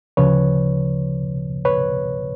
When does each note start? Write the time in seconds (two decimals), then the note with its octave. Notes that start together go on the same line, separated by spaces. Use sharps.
0.17 D2 C#3 F3 B4 C#5
1.65 B4 C#5